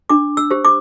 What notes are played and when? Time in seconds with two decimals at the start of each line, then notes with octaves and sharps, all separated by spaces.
0.10 D4 D6
0.37 E6
0.51 G4 C5
0.65 D6